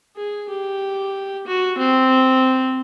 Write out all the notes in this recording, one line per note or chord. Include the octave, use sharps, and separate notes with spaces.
G#4
G4
F#4
C4